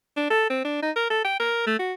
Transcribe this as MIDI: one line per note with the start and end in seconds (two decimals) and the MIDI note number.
0.17 0.26 62
0.30 0.45 69
0.50 0.60 60
0.65 0.79 62
0.82 0.91 63
0.96 1.08 70
1.10 1.21 69
1.24 1.36 79
1.40 1.65 70
1.67 1.77 57
1.79 1.93 66